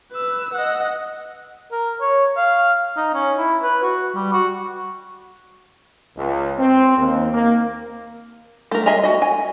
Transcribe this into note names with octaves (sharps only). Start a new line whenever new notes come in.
B4 E6
D#5 F#5
A#4
C#5
F5
D#4
C#4
E4
B4
F#4
G3
F#4
C#2
C4
D#2
A#3
A3 A#4
G#4 D#5 E5 G#5 A#5
F#4 D#5
G#5